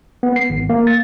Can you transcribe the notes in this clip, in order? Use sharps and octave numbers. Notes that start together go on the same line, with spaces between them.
B3
C7
G#1
A#3
A6